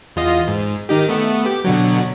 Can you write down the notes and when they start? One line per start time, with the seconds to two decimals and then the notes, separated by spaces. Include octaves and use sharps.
0.16 E2 F4 D#5
0.47 G#2
0.89 D#3 D#4 G4
1.09 A3 B3
1.46 G4
1.64 B2 D3 F#3